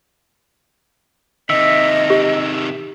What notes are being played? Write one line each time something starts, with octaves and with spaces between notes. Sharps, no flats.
C3 D#3 D#5 E5
G4